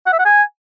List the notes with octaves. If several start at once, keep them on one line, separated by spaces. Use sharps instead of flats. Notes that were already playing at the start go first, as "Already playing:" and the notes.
F#5
E5
F#5
G#5